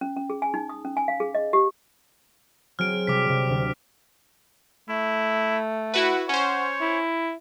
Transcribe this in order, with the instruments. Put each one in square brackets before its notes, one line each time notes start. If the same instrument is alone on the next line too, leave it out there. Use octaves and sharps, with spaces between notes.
[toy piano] C#4
C#4
G#4
G#5
D#4
D#6
C#4
G#5
F5
G#4
D#5
G4
[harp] F#3 C4 G#4 [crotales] F6 D7
[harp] C3 G3 [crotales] D6 B6
[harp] C3
D2
[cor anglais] A3 [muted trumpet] E4
[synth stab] E4 F#4 B4 [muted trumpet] F#5
[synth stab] C#4 C5 [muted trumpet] C#5 [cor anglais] F#5
[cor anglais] E4